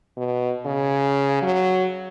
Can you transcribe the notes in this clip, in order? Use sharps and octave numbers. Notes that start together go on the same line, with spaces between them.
B2
C#3
F#3